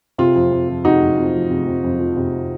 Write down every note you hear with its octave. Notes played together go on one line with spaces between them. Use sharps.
C3 F4
F2
F2
F3
C3 D#4 F#4
F2
F2
F3
C3
F2
F2
F3
C3